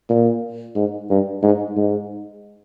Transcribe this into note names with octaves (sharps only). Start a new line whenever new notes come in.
A#2
G#2
G2
G#2
G#2